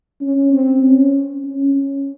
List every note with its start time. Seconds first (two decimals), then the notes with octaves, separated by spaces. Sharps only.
0.21 C#4
0.53 C4
0.83 C#4
1.44 C#4